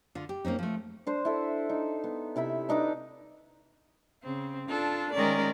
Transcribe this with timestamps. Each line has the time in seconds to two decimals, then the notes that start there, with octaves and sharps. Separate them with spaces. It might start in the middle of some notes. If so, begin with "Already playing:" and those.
0.15 D3 F4
0.29 G4
0.44 A#3 C4 C#4 D#4
0.59 F3 A3
1.07 D4 C5
1.25 E4 A4 E5
1.69 D#4
2.04 B3
2.36 C3 E4 E5 B5
2.69 D4 D#4 B4 D6
4.23 C#3 C4
4.68 D4 F4 A4
5.13 D#3 G#3 C#4 A#4 D5